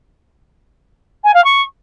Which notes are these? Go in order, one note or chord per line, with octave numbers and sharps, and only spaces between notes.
G#5
F5
C#6